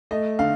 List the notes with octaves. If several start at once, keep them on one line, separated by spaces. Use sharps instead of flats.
A3 D#5
D3 F5